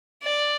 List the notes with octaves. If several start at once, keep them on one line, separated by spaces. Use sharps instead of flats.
D5